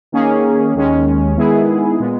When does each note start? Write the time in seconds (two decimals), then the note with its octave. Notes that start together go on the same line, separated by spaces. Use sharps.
0.12 D#3 A#3 C#4 G#4
0.75 D#2 D#3 G#3 C#4
1.37 D#3 G#3 B3 E4 G#4
2.00 A#2 G#3 B3